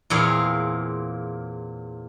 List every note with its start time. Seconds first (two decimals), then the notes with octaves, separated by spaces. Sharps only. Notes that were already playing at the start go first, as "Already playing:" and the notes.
0.10 E2 A#2 C4 G#4 F5